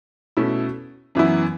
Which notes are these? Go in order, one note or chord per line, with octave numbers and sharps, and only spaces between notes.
B2 A3 C#4 E4
F#2 E3 B3 E4